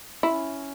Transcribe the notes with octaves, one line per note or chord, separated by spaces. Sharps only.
C#4 E4